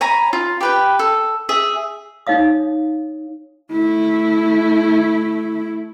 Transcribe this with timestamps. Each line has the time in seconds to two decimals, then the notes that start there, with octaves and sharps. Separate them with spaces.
0.01 C#5 G#5 A#5 B5
0.33 F4
0.61 G4 B4 G5
0.99 A4
1.49 G#4 E5
2.27 D4 D#4 C#5 F5 D#6
3.72 A3 E4